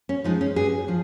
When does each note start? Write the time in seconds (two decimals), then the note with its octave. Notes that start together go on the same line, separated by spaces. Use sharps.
0.09 C#4
0.24 F3 G#3 D#4
0.41 C#4
0.56 G2 G#4
0.88 F3